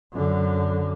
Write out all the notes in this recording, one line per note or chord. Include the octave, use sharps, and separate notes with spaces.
F#2 D3